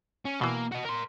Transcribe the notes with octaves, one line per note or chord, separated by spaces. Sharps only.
C#4
B2 E3 A#3
F#4 D#5
A#4 C6